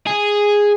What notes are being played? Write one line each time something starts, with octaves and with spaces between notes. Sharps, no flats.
G#4